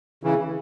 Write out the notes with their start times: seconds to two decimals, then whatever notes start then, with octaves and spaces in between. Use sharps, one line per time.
0.23 C#3 E3